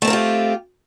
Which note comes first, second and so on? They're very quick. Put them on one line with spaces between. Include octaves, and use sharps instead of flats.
A3 C4 A#4 F4 G4